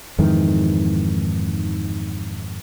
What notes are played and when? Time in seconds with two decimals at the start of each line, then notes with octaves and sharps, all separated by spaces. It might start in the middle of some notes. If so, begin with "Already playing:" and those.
0.19 F2 G#2 D#3 E3